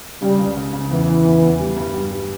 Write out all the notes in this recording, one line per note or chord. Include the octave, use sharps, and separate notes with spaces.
C#3 G3
C#2
C#3
C#3
E2 E3
C#3
E2
E2
G3
G2
G3
G3